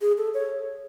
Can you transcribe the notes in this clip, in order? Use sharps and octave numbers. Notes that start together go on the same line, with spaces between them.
G#4
A4
C#5